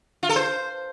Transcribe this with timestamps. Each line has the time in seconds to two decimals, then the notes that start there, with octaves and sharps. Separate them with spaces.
0.23 F4
0.29 A4
0.36 C5